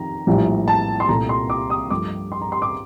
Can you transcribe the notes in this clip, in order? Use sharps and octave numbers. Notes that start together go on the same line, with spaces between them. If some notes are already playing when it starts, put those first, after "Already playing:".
Already playing: F2 D#3 A#5
A#1 A2 G3
A5
C6
C2 A#2 A3 A#5
C6
D6
D#6
G2 F3 A3 D6
C6
A#5
C6
D6